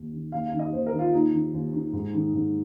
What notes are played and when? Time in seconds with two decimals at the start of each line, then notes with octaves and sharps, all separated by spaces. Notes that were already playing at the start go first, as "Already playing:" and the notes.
Already playing: D#2 D#3
0.13 D#3
0.32 D#2 F5
0.46 F5
0.53 D#3
0.59 D#5
0.72 D#2 C5
0.87 A#4
0.92 D#3
0.99 F4
1.12 D#2 D#4
1.33 D#3
1.53 D#2
1.73 D#3
1.93 G#2
2.14 D#3
2.34 G#2